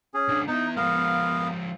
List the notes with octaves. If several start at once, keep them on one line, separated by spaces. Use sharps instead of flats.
C#4 G#4
C#2 D4
B3 D#4 E4
F3 G#3 B3 A#4 F5